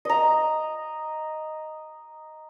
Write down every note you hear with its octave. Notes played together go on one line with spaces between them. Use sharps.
D#5 A#5